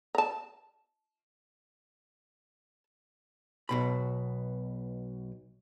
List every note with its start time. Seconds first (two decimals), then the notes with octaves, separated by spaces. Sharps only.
0.15 A5 A#5
3.69 B1 B2 B5